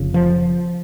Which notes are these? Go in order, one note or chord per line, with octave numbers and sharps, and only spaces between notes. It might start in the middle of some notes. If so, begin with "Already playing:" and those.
Already playing: F1 F2 C#3
F3